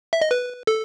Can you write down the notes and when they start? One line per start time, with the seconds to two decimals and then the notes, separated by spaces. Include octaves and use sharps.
0.13 E5
0.21 D#5
0.31 B4
0.67 A4